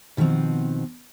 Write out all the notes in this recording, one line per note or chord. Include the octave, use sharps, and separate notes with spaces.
B2 D#3 F3 B3 C4